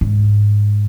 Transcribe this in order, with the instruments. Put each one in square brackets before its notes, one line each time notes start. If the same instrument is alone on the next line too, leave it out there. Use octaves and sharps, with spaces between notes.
[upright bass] G#2